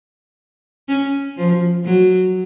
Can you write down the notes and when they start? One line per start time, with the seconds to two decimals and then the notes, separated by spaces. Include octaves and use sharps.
0.89 C#4
1.37 F3
1.85 F#3